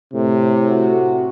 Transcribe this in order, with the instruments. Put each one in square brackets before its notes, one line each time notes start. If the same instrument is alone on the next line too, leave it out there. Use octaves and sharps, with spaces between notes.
[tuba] A2 [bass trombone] C3
[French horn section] F#4